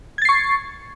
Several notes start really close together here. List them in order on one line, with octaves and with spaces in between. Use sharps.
G#6 A6 C7 C#6